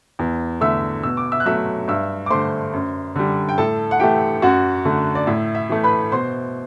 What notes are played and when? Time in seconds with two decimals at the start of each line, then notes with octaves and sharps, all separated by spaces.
0.19 E2
0.61 D3 A3 E5 E6
1.03 B2 E6
1.17 D6
1.32 E5 E6
1.40 F#6
1.46 F#3 A3 E5 E6
1.88 G2 E5 E6
2.26 D6
2.30 D3 A3 C5 C6
2.73 F#2
3.15 D3 G3
3.49 G5
3.58 A2 A4 A5
3.91 F#5
4.00 E3 A3 G4 G5
4.42 F#2 F#4 F#5
4.85 D3 A3
5.15 D5
5.27 A2 E5
5.55 E5
5.69 E3 A3
5.83 B4 B5
6.12 B2 C5 C6